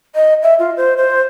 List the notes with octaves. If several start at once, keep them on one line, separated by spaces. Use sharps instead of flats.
D#5
E5
F4
C5
C5